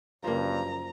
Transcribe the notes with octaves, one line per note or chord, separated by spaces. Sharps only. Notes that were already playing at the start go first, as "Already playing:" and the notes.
F#1 G2 F3 A#3 A#5